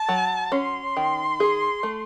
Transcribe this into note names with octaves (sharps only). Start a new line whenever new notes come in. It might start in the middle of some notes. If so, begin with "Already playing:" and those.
Already playing: A5
F#3
C#4 C6
D#3
G#4
A3